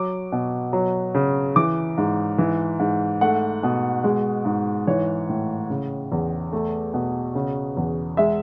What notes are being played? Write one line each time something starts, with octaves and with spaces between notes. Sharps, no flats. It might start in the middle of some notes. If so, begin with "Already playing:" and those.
Already playing: F#3 D6
B2
F#3
C#3
E3 D6
G#2
E3
G#2
A3 F#5
B2
G#3
G#2
E3 C#5
A2
C#3
E2
A3
B2
C#3
E2
G#3 E5